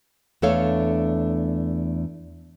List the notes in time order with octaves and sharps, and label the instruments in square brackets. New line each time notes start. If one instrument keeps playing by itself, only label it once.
[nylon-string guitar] E2 A3 D4 A4 C#5 F5